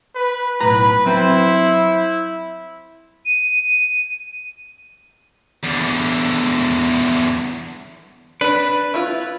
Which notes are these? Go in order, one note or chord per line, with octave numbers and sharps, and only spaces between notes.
B4
B1 A2 B4 A#5 B5
F#3 C4 E4 C5 G5
D#7
E2 D3
D4 B4
E4 F4